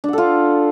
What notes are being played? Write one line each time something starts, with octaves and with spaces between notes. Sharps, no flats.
D4 F4 A4 F#5